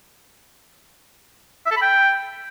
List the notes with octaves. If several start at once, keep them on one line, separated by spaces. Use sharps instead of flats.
E5
A4
B5
G5